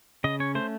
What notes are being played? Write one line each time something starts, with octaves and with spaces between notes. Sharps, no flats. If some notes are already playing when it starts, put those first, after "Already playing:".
C#3 D#5
C#4 C#5
A3 C5